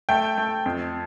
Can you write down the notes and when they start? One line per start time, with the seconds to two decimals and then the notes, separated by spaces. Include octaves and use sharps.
0.09 A3 G5
0.38 A3
0.66 F2